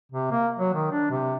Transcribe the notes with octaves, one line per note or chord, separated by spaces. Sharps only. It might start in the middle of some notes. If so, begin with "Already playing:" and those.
C3
A#3
F#3
D#3
D4
C3